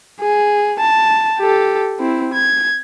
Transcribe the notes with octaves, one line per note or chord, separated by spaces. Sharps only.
G#4
A5
G4 A4
C4 E4
G#6